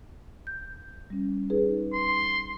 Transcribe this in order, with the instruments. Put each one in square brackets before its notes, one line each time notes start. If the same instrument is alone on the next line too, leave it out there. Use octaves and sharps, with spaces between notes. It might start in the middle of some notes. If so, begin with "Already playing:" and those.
[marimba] G6
G3 C#4
D#4 G#4 B4
[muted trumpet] C6